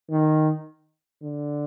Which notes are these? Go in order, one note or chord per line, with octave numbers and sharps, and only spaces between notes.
D#3
D3